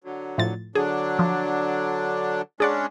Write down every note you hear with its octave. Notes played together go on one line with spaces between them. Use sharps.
D3 F#3
A2 F3 A6
D3 F#3 D4 G#4
F3
G#3 C#4 D4 G#4 D5 F#5